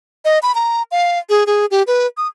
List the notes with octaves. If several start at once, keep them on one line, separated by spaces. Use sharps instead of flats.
D#5
B5
A#5
F5
G#4
G#4
G4
B4
D#6